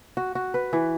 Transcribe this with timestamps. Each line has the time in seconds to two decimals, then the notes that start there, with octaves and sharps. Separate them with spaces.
0.17 F#4
0.35 F#4
0.54 B4
0.73 E3